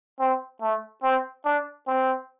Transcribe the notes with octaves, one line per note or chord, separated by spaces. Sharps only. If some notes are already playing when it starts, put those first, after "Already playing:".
C4
A3
C4
D4
C4